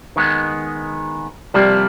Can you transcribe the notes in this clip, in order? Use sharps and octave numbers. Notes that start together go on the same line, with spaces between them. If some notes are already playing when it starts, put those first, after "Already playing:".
D#3 G#3 B3
C3 F3 G3 A#3